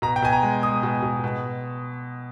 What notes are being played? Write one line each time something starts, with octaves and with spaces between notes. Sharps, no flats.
B2 A#5
G5
B2 G#5
A#5
G#3
G#3 D#6
B2
B2
B2